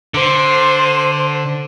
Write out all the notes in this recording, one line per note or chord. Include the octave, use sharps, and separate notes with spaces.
D3 C5